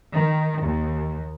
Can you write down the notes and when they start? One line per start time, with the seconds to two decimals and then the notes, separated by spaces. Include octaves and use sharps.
0.12 D#3
0.62 D#2